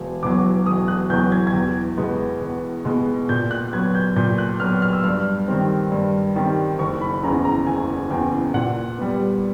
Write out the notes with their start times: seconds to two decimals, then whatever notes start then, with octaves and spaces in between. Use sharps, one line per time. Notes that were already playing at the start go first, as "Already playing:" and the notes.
Already playing: E1
0.23 E2 B2 F#3 D6
0.66 E1 D#6
0.88 F#6
1.10 E2 B2 F#3 G6
1.32 G#6
1.47 G#6
1.53 E2
1.97 B2 G#3 B3
2.42 E2
2.85 B2 G#3 B3
3.29 A#2 G6
3.51 F#6
3.72 F#3 B3 G#6
3.95 G6
4.16 A#2 G6
4.38 F#6
4.60 F#3 B3 F6
4.82 F6
4.93 E6
5.04 G2 F6
5.48 D#3 G3 C4
5.92 G2
6.36 D#3 G3 C4
6.79 F#1 C#6
7.01 B5
7.23 E2 C#3 A#5
7.45 A#5
7.67 F#1 G#5
8.10 E2 C#3 G5
8.54 A#2 F#5
8.98 G3 B3